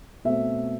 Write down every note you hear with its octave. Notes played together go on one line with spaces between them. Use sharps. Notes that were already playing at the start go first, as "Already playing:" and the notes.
B2 A3 C4 E5